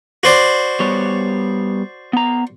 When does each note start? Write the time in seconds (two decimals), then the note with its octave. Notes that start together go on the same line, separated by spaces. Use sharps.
0.23 F#4 C5 D5
0.80 G3 B3 C#5
2.13 B3 A#5